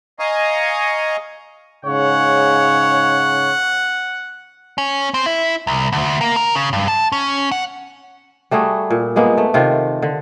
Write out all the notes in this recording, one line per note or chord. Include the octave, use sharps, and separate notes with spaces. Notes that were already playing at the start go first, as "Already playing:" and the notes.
D#5 F5 G#5 A#5 C#6 D#6
G#2 C#3 C#5 F#5
C#4
C4
E4
C2
D2
A#3
A#4
C#3
G2
A5
C#4
F#5
G3 A3 F#4 G#4
A#2
G2 G#3 A#3 B3
A3
C3 D#3 F4
D3